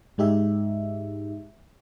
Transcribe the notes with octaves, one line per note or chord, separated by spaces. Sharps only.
G#2 G#3 D#4 G4 E5